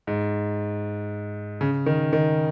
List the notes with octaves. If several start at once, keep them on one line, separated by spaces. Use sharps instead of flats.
G#2
C#3
D#3
D#3